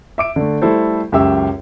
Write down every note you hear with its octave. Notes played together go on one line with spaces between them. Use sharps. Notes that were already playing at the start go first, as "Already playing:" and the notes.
E5 D6 D7
D3 A3
G3 A3 E4 A4 C5
C#2 F#2 G4 E5 E6